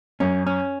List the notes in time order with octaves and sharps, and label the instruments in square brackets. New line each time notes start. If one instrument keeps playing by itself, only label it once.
[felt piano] F#2 [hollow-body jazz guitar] C#4
[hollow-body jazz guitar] C#4